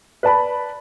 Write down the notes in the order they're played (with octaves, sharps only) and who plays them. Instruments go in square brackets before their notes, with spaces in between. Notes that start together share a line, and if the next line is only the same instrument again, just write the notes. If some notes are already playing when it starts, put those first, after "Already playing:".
[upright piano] B4 D5 A5 B5